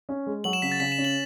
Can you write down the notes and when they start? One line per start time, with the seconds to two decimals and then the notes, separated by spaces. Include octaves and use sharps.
0.09 C#4
0.26 G#3
0.44 F#3 F#7
0.53 E7
0.62 C#3 B6
0.72 A6
0.80 C#3 B6
0.92 E7
0.98 C#4
1.04 F#7